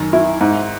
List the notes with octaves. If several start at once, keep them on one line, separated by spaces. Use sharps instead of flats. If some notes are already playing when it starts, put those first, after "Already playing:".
Already playing: F#2 D#3
E4
G#2